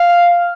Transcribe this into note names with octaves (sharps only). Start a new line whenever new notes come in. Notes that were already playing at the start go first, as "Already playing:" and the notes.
Already playing: F5